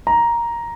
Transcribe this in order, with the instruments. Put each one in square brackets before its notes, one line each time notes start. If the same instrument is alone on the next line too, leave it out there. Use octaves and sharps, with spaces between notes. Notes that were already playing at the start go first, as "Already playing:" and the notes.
[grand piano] A#5